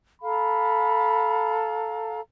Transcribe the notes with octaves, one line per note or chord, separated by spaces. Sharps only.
A4 F5 A#5 B5